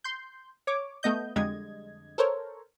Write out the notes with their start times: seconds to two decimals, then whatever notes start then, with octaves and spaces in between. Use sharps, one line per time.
0.04 C6 G6
0.67 C#5 D6
1.03 A3 B3 D#5 G6
1.36 F2 D3 G3 G#3 D#5 G#6
2.18 A4 A#4 C5 C#5